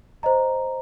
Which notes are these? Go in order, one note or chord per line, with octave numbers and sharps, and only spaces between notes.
C5 D#5 A#5